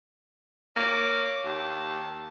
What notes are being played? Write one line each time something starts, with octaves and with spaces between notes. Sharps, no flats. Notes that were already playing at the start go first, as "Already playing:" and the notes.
A#3 C#5 D6
D#2 A5